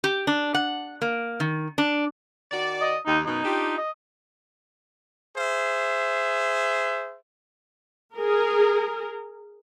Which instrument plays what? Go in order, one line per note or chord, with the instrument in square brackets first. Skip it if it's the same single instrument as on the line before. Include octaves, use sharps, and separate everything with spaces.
[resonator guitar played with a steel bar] G4
D4
F#5
A#3
D#3
D4
[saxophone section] D#3 F#4 D5
[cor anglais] D#5
[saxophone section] D#2 [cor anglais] D#4
[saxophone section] F#2 B2 [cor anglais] D#4
[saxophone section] D4 F4 G4
[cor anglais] D#5
[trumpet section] G#4 C5 E5
[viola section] G#4 A#4